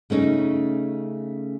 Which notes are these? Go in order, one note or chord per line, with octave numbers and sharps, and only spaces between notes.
C#3 A3 C#4 D#4